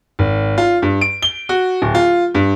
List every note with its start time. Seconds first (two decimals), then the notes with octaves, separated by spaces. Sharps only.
0.19 G#1
0.58 F4
0.82 G2
1.01 D7
1.22 G7
1.49 F#4
1.82 D1
1.95 F4
2.35 G2